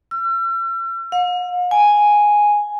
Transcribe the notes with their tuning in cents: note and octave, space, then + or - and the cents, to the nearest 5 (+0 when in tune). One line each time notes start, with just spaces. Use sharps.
E6 +45
F5 +45
G#5 +0